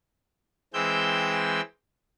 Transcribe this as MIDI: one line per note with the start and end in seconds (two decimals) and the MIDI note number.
0.74 1.61 52
0.74 1.61 56
0.74 1.61 60
0.74 1.61 79
0.74 1.61 88
0.74 1.61 91